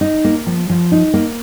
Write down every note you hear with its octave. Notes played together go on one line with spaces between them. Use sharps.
D#4
A#3
F3
F3
D#4
A#3